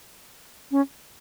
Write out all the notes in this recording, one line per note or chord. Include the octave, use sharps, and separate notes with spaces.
C#4